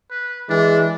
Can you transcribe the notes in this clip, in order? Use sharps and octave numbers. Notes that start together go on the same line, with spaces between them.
B4
E3 G#3 D4